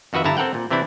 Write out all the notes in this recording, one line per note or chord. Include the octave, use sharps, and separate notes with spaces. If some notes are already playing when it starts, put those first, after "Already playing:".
F2 D#3 F#4 B4 E5
G1 G2 D3 E4 A5 A#5
C4 A4 A#4 F#5 G5
A#2
C3 E3 C4 D4 E4